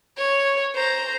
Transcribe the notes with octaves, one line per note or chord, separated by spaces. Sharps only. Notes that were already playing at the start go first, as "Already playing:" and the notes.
C#5
C5 A#5